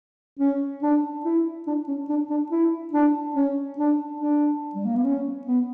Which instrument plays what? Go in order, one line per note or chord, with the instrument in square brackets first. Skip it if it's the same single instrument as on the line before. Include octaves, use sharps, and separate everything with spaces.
[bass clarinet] C#4
D4
E4
D4
C#4
D4
D4
E4
D4
C#4
D4
D4
G3
A#3
B3
C#4
B3